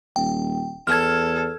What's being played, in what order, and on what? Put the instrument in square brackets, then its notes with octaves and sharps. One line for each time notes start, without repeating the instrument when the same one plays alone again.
[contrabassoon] D#1 [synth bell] G5
[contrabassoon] E2 [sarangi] A4 [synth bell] F6 G#6